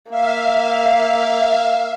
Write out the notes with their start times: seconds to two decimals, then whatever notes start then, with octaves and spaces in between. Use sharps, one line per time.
0.10 A#3 E5 F5